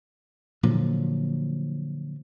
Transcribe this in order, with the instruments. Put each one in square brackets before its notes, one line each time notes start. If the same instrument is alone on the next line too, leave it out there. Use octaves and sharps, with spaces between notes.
[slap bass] A#2 D3 F3 F#3